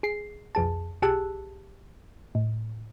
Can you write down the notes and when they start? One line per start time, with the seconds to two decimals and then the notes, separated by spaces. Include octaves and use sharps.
0.03 G#4 C7
0.55 B1 F2 G#4 A5
1.02 B1 G4 G#4 A5 E6 F#6
2.35 A2